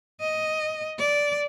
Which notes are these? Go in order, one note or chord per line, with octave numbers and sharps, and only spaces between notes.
D#5
D5